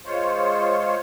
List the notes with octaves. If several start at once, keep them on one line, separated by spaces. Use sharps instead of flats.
G#3 F4 C5 C#5